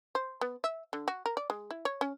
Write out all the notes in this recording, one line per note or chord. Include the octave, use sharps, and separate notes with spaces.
C5
B3
E5
D3
F#4
A#4
D5
G#3
E4
C#5
C#4